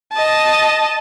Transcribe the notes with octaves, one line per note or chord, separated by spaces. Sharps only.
D#5 A5